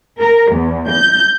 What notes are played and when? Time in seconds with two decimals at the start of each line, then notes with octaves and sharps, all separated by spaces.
0.20 A#4
0.52 E2
0.91 G6